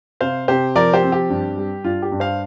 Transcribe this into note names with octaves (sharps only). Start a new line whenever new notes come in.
C3 C5 F5
C3 G4 C5
F3 A#4 D5
G4 C5
C4
G4
G2
G3
G2 F4
G4
G2
C5 F5